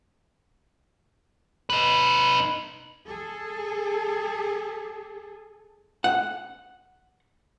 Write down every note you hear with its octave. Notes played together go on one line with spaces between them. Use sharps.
D#4 B4
G#4 A4
F#5